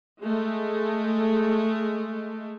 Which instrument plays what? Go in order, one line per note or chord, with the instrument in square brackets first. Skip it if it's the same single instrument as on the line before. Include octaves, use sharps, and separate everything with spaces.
[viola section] G#3 A3